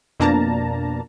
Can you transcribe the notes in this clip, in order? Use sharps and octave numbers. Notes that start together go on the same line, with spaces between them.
F2 B2 A#3 D4 A5 A#5